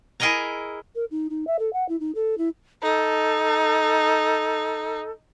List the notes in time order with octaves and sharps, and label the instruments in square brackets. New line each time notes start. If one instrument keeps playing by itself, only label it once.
[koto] E4 G#4 A#4 D#5 G#5 A#5
[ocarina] A#4
D#4
D#4
E5
A4
F#5
E4
D#4
A4
E4
[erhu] D#4 [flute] A4